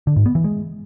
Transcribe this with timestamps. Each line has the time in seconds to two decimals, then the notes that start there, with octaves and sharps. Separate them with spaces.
0.07 D3
0.16 G#2
0.26 B3
0.35 E3
0.44 G#3